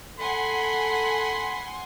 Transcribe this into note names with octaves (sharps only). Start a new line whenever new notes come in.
A4 F#5 G#5 B5 C6